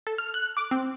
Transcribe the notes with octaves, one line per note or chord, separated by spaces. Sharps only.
A4
F6
F#6
D6
C4